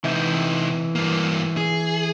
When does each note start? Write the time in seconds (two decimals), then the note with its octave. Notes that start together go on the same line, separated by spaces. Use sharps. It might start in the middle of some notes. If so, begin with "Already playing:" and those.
0.04 C3 E3 D#4 E5 G6
0.95 G2 A#3
1.57 G#4